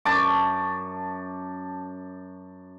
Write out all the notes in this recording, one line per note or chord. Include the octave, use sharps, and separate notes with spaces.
F#2 A5 D6